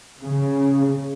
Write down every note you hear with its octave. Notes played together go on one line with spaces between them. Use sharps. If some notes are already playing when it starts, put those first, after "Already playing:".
C#3